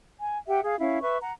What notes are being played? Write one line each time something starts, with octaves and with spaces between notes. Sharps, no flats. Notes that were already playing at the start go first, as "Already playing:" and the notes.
G#5
G4 E5 F#5 G5
G#4 F5
C#4 E4 F5
B4 E5 C#6
F#5 A#5